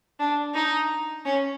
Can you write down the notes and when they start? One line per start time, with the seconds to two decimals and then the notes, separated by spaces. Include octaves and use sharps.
0.20 D4
0.55 D#4
1.26 C#4